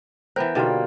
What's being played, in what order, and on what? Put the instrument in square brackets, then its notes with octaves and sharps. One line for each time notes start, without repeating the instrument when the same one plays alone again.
[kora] E3 B3 A#4 [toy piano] C5 [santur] G5
[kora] B2 D3 [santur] G3 A#3 F4 [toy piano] D#4 F#4